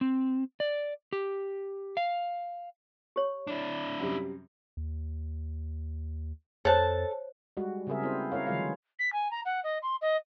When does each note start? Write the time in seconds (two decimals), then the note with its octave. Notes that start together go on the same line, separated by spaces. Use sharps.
0.01 C4
0.60 D5
1.13 G4
1.97 F5
3.16 G4 C#5
3.47 D4 E4
3.99 F#2 C3 G3
4.77 D#2
6.65 F2 A4 C5 C#5 A5
7.57 G3 G#3 F#4
7.87 C#3 G3 C4 G#4 A#4 E5
8.02 B3 C4 E4 A4 C5
8.32 C#4 E4 A#4 C#5 F5
8.47 D3 E3 F#3 G#3 F4 F5
8.99 B6
9.12 G#5
9.31 A#5
9.45 F#5
9.63 D#5
9.82 C6
10.01 D#5